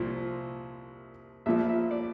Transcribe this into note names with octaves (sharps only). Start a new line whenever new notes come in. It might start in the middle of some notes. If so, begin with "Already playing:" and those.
Already playing: C2 A#2 F3
A#1 A#2 F3 E5
E5
D5